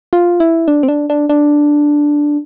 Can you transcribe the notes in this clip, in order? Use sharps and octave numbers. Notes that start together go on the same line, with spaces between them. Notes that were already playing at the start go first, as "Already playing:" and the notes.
F4
E4
D4
C4
D4
D4
D4